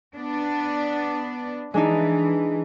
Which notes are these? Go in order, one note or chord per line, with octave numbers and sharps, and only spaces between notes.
B3 D4
E3 G#3 D4 D#4